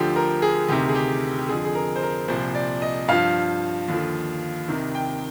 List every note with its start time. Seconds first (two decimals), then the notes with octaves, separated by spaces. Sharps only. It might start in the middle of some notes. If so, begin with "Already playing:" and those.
Already playing: D2 D3 F3 G4
0.16 A#4
0.42 G#4
0.69 D2 C3 D#3 G4
0.89 G#4
0.95 G4
1.39 G4
1.49 F2 D3 F3 G#4
1.65 G#4
1.75 A#4
1.96 C5
2.02 A#4
2.28 C2 A#2 F3 C5
2.55 D5
2.82 D#5
3.08 G2 F3 F5
3.88 D#2 D3 F3
4.68 C2 C3 D#3
4.95 G5